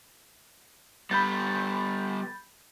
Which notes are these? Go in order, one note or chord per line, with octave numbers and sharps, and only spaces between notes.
G3 B3 B5 G6 A6